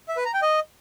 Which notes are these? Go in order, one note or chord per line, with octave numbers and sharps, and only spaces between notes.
E5
B4
A#5
G5
D#5